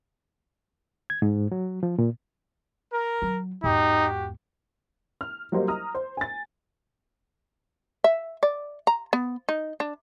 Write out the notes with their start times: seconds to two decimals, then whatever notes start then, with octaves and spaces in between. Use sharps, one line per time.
1.10 G#6
1.22 G#2
1.52 F#3
1.83 F3
1.98 A#2
2.92 A#4
3.22 F#3
3.64 E2 G#2 D#4 F#4 G4
5.21 F6
5.52 F#3 G3 A#3 G4 C5 D#5
5.68 A#5 D#6 F6
5.95 C5
6.17 G#5 A6
8.04 E5
8.43 D5
8.87 A#5
9.13 B3
9.49 D#4
9.80 D4